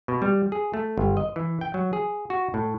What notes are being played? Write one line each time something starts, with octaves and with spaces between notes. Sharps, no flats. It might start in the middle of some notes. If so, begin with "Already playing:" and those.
B2
G3
G#4
A3
G1
D#5
E3
G5
F#3
G#4
F#4
A2